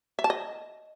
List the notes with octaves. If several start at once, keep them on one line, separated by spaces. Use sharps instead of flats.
E5
A5
D#5